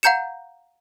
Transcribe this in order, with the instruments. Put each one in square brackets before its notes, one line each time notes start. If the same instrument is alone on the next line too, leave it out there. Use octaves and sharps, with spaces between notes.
[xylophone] F5 F#5 A#5 G6 C#7 E7